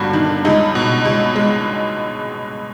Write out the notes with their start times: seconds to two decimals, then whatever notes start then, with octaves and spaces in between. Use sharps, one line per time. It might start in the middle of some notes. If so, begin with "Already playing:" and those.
Already playing: G1 G2 F#4
0.13 D#3
0.45 C#2 D#4
0.75 B2
1.05 C#2
1.36 G#3